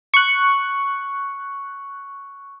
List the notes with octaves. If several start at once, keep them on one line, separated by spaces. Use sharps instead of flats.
C#6 F#6